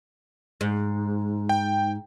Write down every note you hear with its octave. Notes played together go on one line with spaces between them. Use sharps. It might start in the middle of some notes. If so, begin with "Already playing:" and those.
G#2
G5